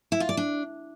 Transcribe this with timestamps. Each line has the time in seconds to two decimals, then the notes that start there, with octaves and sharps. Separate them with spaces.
0.12 E4
0.20 F4
0.29 D5
0.37 D4